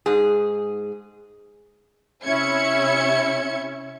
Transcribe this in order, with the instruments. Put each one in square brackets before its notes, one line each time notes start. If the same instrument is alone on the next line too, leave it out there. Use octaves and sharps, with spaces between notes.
[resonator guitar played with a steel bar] G#2 G#4
[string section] C3 C#4 E4 E5 G#6 C#7